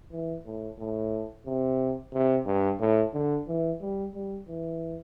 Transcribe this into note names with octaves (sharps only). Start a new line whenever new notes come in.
E3
A2
A2
C3
C3
G2
A2
D3
E3
G3
G3
E3